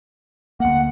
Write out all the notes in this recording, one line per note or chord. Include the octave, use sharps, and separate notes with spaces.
D2 A#3 F#5